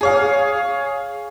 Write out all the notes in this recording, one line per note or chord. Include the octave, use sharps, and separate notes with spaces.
G#4 C#5 F5